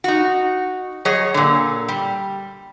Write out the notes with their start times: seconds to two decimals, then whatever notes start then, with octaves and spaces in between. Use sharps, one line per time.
0.04 D#4 F#4
1.05 F#3 G#4 C#5 D#5
1.34 A#2 D3
1.88 G3